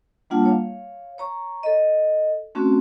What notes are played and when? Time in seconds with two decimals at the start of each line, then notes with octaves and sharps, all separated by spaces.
0.30 G3 A#3 D4 F4 F#5 A5
0.45 C#5 F5
1.18 C#5 A#5 C#6
1.63 A4 D#5
2.55 A3 C4 C#4 F#4